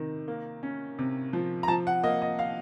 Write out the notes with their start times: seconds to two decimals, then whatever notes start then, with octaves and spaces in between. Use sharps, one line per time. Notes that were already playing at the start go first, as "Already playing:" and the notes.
Already playing: C3 D#3
0.28 A#3
0.63 C#4
0.99 C3
1.33 F3
1.63 A#5
1.68 F3 A5
1.87 F#5
2.03 A#3 D#5
2.22 D#5
2.39 F5